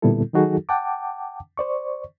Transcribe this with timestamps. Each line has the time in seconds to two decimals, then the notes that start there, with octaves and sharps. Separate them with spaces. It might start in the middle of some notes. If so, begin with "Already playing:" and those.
0.02 A#2 D3 G3 B3 E4 A4
0.33 D#3 F#3 D#4 F#4 G#4 A4
0.69 F#5 G5 A5 D6
1.57 C5 D5 C#6